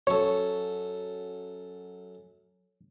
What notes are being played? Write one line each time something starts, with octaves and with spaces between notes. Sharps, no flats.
F#2 A4 C#5